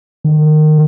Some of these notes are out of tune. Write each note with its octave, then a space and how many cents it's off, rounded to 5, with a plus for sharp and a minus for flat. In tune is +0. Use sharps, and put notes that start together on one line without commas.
D#3 -20